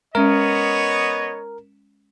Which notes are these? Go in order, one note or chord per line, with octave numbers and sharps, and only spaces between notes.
G#3 B3 C#4 A#4 C#5 D#5